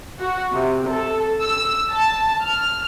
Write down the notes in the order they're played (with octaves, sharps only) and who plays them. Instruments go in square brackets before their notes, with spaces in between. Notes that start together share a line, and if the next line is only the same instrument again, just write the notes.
[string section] F#4
C3
A4
E6
A5
F6